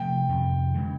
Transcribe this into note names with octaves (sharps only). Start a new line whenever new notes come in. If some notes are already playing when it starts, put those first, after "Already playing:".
Already playing: C3 F3 A3 G5
F2 C3 D#3
C#3 E3 G#3